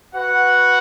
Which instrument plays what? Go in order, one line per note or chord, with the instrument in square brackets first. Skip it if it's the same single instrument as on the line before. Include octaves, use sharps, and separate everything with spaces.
[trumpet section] F#4 B4 F#5